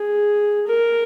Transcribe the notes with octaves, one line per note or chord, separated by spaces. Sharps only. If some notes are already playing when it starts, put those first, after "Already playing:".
Already playing: G#4
A#4